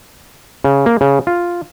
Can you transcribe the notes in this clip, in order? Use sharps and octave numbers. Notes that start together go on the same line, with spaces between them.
C#3
A#3
C#3
F4